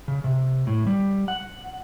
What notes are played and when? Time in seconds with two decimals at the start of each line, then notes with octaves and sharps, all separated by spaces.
0.08 C#3
0.24 C3
0.67 A2
0.86 G3
1.28 F#5